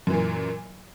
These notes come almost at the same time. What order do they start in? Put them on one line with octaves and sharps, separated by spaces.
F#2 E3 A#2